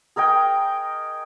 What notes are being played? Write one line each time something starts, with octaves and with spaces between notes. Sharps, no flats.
G#4 A#4 D#5 G5